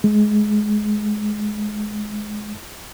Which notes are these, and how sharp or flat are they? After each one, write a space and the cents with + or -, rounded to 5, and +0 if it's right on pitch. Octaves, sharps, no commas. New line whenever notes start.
G#3 +20